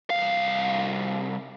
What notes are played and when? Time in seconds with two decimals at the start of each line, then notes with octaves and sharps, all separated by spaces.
0.10 C2 F5